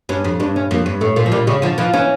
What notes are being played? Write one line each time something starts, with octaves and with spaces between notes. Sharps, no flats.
G2 C#4
F2
G2 D4
C#4
F2 A#3
G2
A2 A3
A#2
F3
A#2 G3
C#3 G3
D3 F3
E3 F3
E3 C#4